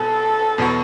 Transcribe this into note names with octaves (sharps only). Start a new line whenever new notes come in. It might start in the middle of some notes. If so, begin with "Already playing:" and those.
Already playing: B2 F#3 B3 A4
E2 B2 F#3 B3 F#4